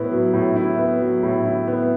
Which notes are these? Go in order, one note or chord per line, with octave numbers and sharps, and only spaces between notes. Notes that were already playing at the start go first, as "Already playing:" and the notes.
Already playing: A2 B3 E4
F#3
A2
E4
B3
F#3
A2
E4
B3